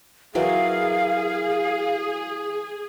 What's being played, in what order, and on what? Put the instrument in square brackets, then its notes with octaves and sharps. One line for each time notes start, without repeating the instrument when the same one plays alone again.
[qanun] E3 F#3 A#4 [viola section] G#4 [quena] F5